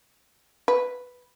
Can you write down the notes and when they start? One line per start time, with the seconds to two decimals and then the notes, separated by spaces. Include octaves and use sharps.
0.68 B4